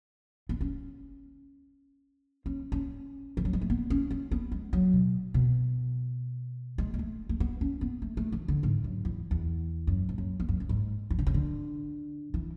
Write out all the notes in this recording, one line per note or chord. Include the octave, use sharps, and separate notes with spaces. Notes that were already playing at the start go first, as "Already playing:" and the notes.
B3
C#4
C#4
C#4
E3
F#3
G#3
A3
B3
C#4
C#4
B3
G#3
F#3
B2
B2
G#3
G#3
A3
A3
B3
C#4
B3
A3
A3
E3
D3
G#2
F#2
E2
E2
F#2
G#2
F#2
E2
F#2
F#2
G#2
E3
D3
C#3
D3
E3